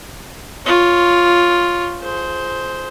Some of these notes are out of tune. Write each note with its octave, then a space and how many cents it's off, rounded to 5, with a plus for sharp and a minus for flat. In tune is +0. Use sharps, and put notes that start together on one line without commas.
F4 +0 C#5 +0
G#4 +30 C5 +0